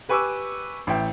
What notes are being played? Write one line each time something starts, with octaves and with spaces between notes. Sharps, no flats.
G4 B4 G#5 C#6 D6 E6
A1 E5 G5